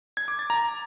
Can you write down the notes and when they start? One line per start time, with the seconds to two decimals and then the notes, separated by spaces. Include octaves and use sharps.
0.17 G#6
0.28 D6
0.39 A6
0.50 A#5